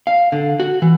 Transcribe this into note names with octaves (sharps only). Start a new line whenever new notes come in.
F5
D3
F#4
E3